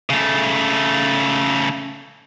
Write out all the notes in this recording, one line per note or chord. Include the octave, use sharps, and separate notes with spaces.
C#3 A3